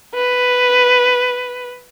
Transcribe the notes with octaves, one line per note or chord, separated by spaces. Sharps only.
B4